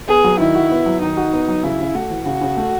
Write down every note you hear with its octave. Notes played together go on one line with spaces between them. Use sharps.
B3 G#4
F#3
D#3 E4
F#4
B3
F#3
D#3 D#4
F#4
B3
F#3
C#3 E4
C#3
A3 F#4
E3
C#3 F#4
C#3
A3